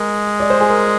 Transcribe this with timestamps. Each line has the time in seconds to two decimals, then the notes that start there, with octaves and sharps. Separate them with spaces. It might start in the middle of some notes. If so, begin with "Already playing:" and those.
Already playing: G#3 A#4
0.40 D5
0.50 C5
0.61 G#4
0.70 A#4